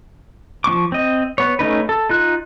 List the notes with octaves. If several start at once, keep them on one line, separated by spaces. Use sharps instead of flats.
F3 C4 C#6 D6
C4 D#5
B3 C#5
A3 C#4 D#4 B4
A4
D#4 F4 F#6